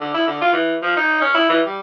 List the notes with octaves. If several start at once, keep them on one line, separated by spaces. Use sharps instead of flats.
D3
E4
D3
F4
E3
F3
D#4
C#4
E4
E3
G3